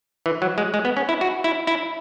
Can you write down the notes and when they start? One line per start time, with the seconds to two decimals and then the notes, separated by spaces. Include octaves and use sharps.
0.26 E3
0.42 F#3
0.58 G#3
0.74 G#3
0.85 B3
0.97 C#4
1.09 E4
1.21 F#4
1.44 E4
1.67 E4